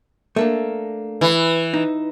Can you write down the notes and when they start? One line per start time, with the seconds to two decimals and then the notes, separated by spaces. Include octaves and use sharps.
0.36 A3 A#3 D4
1.21 E3
1.74 D#4